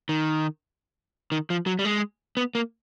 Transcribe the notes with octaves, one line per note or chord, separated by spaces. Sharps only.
D#3
D#3
F3
F#3
G3
G#3
B3
A#3